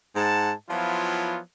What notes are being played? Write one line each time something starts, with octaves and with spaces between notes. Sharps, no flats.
G#2 F#5 A5
F3 F#3 B3 E4 F4